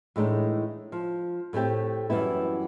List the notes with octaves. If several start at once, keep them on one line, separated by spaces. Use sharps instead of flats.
A2 E3 G#3 A3 D4 D#4
F3
A2 A3 C4 G4 G5
F#2 E3 G3 B3 E4